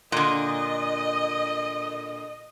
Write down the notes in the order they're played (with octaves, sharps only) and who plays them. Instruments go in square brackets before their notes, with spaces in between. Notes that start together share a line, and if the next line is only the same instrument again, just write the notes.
[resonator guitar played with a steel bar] A#2 D3 [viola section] D#5